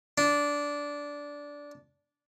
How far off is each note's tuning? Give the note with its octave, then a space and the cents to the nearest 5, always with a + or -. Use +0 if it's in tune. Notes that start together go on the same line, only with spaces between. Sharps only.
D4 -15